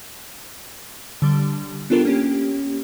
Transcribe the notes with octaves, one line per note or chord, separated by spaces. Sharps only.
D3 G3
B3 D4 F4 G4 A4 A#4
A#3 C#4 G4